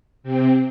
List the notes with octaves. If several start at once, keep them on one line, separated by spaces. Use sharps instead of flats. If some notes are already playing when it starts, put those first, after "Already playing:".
C3 C4